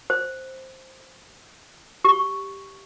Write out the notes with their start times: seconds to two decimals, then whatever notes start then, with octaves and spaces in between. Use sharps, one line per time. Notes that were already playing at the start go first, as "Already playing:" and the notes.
0.10 C5
2.05 G4 C#6